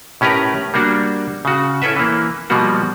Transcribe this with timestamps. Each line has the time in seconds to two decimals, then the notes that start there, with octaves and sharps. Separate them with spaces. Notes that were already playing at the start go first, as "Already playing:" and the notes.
0.21 A2 C#4 G4 A#4 B4 A#5
0.74 G3 A#3 D4 F#4
1.45 C#3 F#4
1.82 C#4 E4 A4 B4 E5
1.96 E3 A#3
2.50 B2 F3 G3 A#3 F#4